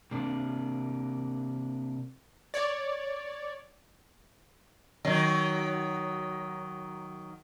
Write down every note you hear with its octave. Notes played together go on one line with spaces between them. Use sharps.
C3 A#3 D4
C#5 D5
D#3 F#3